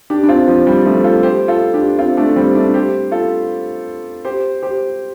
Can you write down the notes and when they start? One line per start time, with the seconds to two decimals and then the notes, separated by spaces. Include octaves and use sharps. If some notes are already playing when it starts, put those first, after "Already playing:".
0.10 D4 G4
0.24 D4
0.29 C4 F4
0.48 F3
0.67 G3
0.85 F3 A3
1.04 F4 A4
1.23 G4 C5
1.48 F4 A4
1.74 D4 G4
1.99 C4 F4
2.17 A3 D4
2.36 G3 C4
2.55 A3 D4
2.74 G4 C5
3.12 F4 A4
4.25 G4 C5
4.63 G4 C5